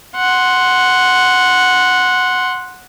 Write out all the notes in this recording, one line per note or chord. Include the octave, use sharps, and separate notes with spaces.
F#5 C6